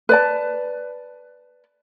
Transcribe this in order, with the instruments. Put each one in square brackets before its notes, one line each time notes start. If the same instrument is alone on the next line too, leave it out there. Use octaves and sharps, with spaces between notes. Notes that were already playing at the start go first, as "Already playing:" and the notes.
[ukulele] B4 D5 A5